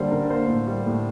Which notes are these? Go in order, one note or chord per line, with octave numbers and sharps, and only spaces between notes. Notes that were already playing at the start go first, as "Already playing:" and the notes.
Already playing: D3 G3 A#3 C5 D5
D3 A#4
A#3 C5
A2
G3
A2